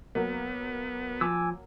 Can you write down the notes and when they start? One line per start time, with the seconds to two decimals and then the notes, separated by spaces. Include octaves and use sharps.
0.15 F#3 A#3 B3
1.21 F3 G#5 D6 E6